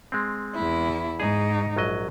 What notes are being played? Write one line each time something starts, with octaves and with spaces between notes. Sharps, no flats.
G#3 C4
E2 E4
G#2 D#4 G#4
A#1 F#3 D#5